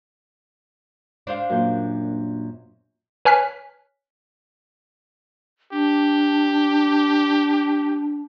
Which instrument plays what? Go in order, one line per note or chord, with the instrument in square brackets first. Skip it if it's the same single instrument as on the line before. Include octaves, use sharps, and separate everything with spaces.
[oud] D4 C5 F5
[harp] F#2 A#2 G6
[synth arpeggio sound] B4 C#5 G#5 F6 F#6 B6
[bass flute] D4 [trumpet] G4